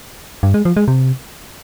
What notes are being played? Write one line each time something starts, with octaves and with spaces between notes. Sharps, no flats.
G2
G#3
F3
G#3
C3